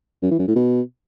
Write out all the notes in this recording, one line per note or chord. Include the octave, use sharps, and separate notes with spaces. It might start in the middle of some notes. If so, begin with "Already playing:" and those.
F#2
E3
F#2
A2
B2